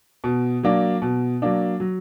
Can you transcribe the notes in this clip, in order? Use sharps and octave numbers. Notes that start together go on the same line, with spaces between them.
B2
F#3 A#3 D4
B2
F#3 A#3 D4
F#3